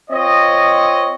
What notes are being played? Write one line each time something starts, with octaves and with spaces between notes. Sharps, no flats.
C4 F4 C#5 D#5